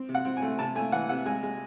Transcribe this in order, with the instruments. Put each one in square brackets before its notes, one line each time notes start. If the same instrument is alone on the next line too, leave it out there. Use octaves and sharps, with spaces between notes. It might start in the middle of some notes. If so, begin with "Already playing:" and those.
Already playing: [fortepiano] C4
C3
F#5
C4
G#5
A3
C3 A5
A3 G#5
E3 F#5
C3 F#5
G#3 G#5
G#3